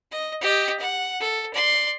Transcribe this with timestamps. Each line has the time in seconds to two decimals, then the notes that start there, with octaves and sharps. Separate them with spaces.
0.11 D#5
0.41 G4 D#5
0.79 F#5
1.20 A4
1.54 D5 C6